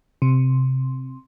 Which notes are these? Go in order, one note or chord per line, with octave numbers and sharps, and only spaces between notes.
C3